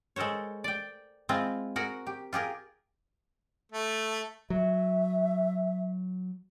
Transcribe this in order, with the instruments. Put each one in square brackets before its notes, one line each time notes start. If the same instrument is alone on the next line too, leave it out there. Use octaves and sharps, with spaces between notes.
[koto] G#3 A4 A#4 C5 C#5
D5 G5
G#3 C4 E4 F4
F#4 G#4 A#4 F#5
G4
F4 G4 G#4 A#4
[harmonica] A3
[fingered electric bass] F#3 [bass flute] E5